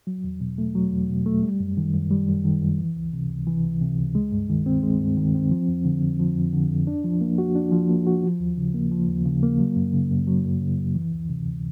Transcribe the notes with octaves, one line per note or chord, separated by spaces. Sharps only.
F#3
E2
B2
A3
F#3
E2
B2
A3
G3
F#2
D#3
F#2
G3
F#2
D#3
F#2
E3
C#2
C3
C#2
E3
C#2
C3
C#2
G#3
G2
D#3
C4
G#3
G2
D#3
C4
F3
F2
D3
F2
F3
F2
D3
F2
D4
F3
A#3
F#4
D4
F3
A#3
F#4
F3
D#2
C#3
A#3
F3
D#2
C#3
A#3
F#3
F#2
C#3
F#2
F#3
F#2
C#3
F#2
E3
D2
C3
D2